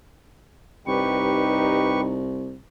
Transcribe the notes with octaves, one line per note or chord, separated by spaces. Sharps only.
C2 G2 D#4 G4 B4 C#6